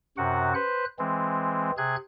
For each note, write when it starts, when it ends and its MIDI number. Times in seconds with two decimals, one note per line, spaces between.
0.17 0.54 42
0.17 0.54 48
0.17 0.54 66
0.17 0.54 78
0.55 0.85 71
0.55 0.85 72
0.55 0.85 90
0.99 1.71 52
0.99 1.71 56
0.99 1.71 60
1.77 1.96 48
1.77 1.96 68
1.77 1.96 90
1.77 1.96 92